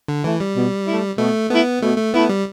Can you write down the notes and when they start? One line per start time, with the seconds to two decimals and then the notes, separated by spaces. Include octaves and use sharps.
0.08 D3
0.24 E3 A3 E4
0.40 G3
0.56 B2
0.87 A3 E4
1.18 B2 A3
1.50 A3 B3 E4
1.82 B2 A3
1.97 A3
2.13 A3 B3 E4
2.29 G3